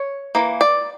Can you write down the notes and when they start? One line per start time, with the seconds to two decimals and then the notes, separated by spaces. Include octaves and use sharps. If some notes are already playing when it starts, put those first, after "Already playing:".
Already playing: C#5
0.35 E3 A#3
0.61 D5